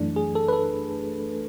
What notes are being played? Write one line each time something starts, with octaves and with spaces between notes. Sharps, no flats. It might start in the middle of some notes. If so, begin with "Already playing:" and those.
Already playing: F#2 E3 A3 D4
G#4
A4
B4
A4